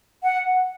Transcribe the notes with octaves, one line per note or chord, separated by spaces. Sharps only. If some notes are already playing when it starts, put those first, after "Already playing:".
F#5